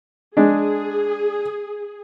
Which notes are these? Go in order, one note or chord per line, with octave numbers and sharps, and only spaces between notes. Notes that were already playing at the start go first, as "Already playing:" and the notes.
G#3 D4 G#4